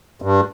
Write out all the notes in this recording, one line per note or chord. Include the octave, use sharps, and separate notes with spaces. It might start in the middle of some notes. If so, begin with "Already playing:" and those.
G2